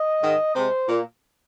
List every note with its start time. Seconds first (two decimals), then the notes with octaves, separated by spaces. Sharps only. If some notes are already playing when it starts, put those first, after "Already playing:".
Already playing: D#5
0.22 G#2 D#3 G#3
0.55 C3 G#3 C5
0.88 A#2 A#3